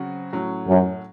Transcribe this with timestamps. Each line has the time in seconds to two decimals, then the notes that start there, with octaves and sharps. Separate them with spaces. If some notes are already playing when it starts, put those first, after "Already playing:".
Already playing: C#3 F#3 C4 F#4
0.33 A2 F#3 C#4
0.67 F#2